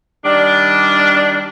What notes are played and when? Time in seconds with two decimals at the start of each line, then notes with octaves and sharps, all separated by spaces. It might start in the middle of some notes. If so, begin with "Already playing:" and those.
0.24 D#3 G3 D4